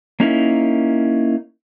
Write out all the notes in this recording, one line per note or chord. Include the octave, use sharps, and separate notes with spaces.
A#3 C#4 D#4 E4 A#4